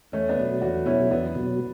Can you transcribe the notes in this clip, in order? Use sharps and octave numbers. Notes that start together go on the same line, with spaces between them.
E2 A3 C#4
B3 D4
B2 F#3
E2 D4 F#4
B2 F#3 C#4 E4
E2 B3 D4
B2 F#3